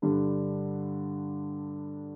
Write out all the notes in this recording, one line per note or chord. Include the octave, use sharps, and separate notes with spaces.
G2 D3 G3 D4